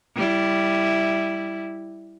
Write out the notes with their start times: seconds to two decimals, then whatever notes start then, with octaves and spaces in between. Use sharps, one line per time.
0.16 G3 E4